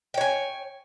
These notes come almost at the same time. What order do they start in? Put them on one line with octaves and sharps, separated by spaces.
G5 C#5 G#5